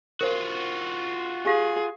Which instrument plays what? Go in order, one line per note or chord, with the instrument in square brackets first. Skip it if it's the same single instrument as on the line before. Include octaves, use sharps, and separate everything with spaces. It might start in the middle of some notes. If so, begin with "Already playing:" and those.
[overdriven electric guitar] F4 F#4 [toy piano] A#4 C5
[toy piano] G4 F5 [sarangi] G#4